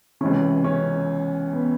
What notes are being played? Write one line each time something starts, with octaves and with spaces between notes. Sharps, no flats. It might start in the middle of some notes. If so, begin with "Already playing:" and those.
C#2 C3 E3 C#4
C#4
B3